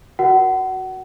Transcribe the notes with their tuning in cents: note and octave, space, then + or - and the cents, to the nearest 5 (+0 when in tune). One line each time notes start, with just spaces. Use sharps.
F#4 +0 A#4 +15 F#5 +30